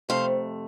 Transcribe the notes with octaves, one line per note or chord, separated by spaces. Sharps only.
F2 C3 A3 C5 F5